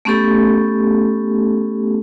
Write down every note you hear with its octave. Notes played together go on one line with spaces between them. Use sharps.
A3 B3 C#4 G4 A4